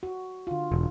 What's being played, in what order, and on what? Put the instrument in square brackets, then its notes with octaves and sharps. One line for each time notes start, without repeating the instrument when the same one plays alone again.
[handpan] F#4
D3 F4
[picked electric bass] E1